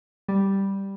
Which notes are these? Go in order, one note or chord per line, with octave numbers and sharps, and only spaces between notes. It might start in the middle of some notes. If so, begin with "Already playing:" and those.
G3